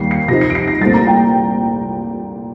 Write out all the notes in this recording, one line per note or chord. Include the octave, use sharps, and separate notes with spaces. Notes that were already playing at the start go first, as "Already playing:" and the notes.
Already playing: D#2 G3 C7
C7
C3 F3 C4 D#4 A#6
C7
D7
C7
A#6
C2 A#2 A3 C4 A6
A#5
G5